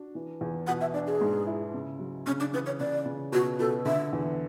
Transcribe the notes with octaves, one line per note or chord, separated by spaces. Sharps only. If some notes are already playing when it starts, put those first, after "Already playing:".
Already playing: D4 F#4
E3
E2
B2 F#5
E5
D4 D5
G#4
G#2
E4
C#3
F#3
C#3 C#4
D4
E3 B4
C#5
C#3 D5
C#3
B2 F#4
B2 A4
D3 E5
E2